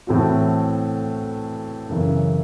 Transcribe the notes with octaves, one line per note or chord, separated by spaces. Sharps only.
A2 E3 A3 C4 F#4
F#2 C#3 E3